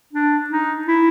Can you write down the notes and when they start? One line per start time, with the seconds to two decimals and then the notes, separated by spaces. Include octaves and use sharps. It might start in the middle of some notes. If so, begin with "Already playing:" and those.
0.13 D4
0.49 D#4
0.87 E4